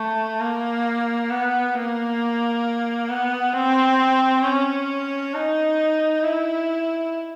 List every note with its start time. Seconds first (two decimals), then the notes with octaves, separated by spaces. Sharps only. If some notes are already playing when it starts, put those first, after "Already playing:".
Already playing: A3
0.40 A#3
1.30 B3
1.75 A#3
3.09 B3
3.53 C4
4.43 C#4
5.34 D#4
6.23 E4